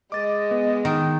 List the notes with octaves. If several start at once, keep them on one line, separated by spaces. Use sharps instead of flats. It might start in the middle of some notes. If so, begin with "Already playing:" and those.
G#3 D#5 D6 A6
B3
D#3